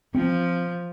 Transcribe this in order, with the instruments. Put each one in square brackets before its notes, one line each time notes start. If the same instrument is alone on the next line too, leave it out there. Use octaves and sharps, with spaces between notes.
[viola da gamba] F3 [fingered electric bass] C4